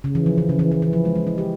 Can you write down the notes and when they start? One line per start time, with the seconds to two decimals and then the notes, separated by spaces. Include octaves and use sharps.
0.04 C#3
0.15 E3
0.26 F3
0.38 E3
0.49 C#3
0.59 E3
0.72 E3
0.82 E3
0.93 F3
1.05 G#3
1.15 G#3
1.27 E4
1.38 G4